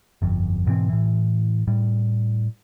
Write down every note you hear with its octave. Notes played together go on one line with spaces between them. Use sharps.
G1 F2
G#2 B2 E3 C4
A2 E3
A2 G3